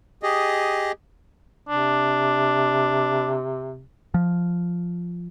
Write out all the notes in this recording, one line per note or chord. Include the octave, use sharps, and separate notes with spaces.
G4 G#4 D#5
C3 D4
F3